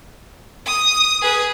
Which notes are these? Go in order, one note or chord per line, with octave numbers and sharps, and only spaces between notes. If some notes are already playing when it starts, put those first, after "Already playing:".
D#6
G#4 B4